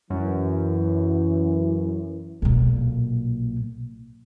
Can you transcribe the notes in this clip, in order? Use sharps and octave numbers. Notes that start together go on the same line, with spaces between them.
F#2 E3
B1 A#2